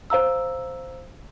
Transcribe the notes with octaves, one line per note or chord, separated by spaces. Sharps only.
C5 F5 A#5 E6